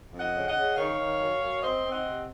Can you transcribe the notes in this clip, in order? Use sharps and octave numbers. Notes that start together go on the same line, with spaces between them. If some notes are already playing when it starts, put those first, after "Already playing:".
F2
D#5 F#5
C#3
D#5 F#5
C#3
D#3 C#5 F5
D#3
F#2
F#2
C4 C5 D#5
C4
D#5 F#5
C3